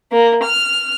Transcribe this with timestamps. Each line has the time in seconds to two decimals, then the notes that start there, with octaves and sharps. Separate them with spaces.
0.11 A#3
0.43 F6